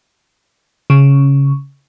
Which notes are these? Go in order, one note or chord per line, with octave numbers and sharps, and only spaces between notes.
C#3